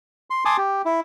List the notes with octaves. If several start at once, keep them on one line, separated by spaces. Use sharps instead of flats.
C6
G#5 A5 C6 D6 D#6
G4
E4